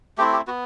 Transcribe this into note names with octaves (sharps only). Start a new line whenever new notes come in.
A3 C4 E4 G4
G4
B3 F#4